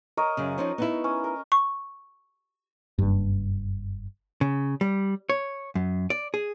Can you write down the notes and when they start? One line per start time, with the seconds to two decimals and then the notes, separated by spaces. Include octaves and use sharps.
0.17 A#4 C#5 D#5
0.37 F#2 C#3
0.58 F3 C#4 D#4
0.78 B3 D#4 E4
1.04 C#4
1.24 A#4
1.52 C#6
2.98 F#1 G2
4.41 C#3
4.81 G3
5.30 C#5
5.75 F#2
6.10 D5
6.34 G#4